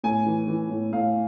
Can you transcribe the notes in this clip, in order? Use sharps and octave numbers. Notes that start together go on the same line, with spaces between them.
A2 G#5
E3
E3
A2
A2 F5